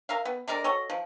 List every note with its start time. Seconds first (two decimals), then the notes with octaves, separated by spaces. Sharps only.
0.09 A#4 E5 F5
0.25 B3
0.48 D3 G#3 A#4 D5
0.64 F#4 A4 C#5 D#5
0.90 F3